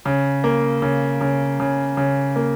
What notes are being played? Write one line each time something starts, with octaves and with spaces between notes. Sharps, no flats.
C#3
A#3
C#3
C#3
C#3
C#3
A#3